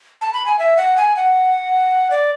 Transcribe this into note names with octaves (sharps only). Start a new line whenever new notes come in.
A5
B5
G#5
E5
F#5
G#5
F#5
D5